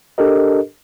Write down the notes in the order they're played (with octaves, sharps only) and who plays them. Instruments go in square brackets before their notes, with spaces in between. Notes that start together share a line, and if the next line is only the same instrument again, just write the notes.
[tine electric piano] D4 G4 A4 A#4 D#5